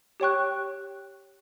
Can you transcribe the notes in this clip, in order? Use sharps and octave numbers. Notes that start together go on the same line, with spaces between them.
G4 C#5 G5 C#6 F#6